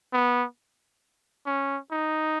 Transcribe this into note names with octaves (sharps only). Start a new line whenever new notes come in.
B3
C#4
D#4